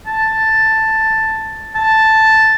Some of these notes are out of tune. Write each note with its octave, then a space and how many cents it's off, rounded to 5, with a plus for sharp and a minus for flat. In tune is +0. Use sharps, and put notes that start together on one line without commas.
A5 +5
A5 +0